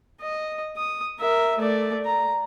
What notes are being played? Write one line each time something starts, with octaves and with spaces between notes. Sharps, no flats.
D#5
D#6
A#4 E5
A3 D5
A#5